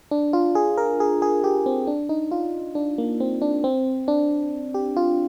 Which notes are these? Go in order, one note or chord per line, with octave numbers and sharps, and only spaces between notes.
D4
F4
G#4
A#4
G#4
G#4
G4
C4
D4
D#4
F4
D4
A#3
C4
D4
C4
D4
G4
F4